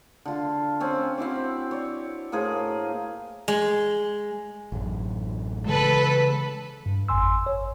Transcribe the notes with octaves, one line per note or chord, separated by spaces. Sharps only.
D3 F4
C4 C#4
C4 E4 F#4 D6
C#5 D5
A2 A#3 G#4 C5
G#3
A1 F#2
C#3 E3 G#3 A4 B4
G2
G#1 F2 G#5 C6 E6
C#5